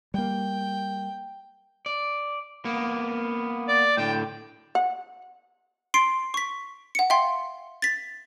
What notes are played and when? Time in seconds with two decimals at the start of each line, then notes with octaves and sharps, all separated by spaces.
0.14 G3 A#3 G5
1.86 D5
2.65 A#3 B3
3.68 D5
3.97 A2 D3 G5
4.75 F#5
5.94 C6 C7 D7
6.34 C#6 B6
6.95 F#5 C#7
7.10 E5 F5 G5 C6
7.82 A6 B6